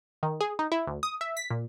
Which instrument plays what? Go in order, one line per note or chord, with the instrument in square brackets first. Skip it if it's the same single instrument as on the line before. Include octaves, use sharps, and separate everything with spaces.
[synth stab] D#3
G#4
D#4
E4
D2
D#6
E5
B6
A#2